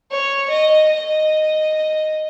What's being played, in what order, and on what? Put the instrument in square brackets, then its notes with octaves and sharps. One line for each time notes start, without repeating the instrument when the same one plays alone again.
[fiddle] C#5
D#5
D#5